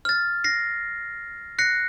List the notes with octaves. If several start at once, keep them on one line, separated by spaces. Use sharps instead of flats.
F6 A6
A#6 C7
F#6 A#6 C7 C#7